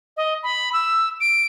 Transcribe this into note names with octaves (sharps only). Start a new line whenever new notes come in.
D#5
B5
E6
D7